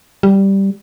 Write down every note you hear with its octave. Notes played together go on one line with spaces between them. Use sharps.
G3